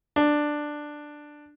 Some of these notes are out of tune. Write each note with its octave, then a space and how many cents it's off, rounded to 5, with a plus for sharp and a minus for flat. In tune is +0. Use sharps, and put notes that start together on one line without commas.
D4 +10